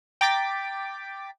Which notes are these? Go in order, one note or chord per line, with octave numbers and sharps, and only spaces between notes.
G5 A#5 D6 A6 B6 D7